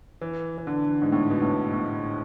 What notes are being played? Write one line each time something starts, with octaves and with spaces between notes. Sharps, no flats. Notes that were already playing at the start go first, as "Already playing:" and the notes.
E3
E3
D3
G#2
A2
B2
A2
A2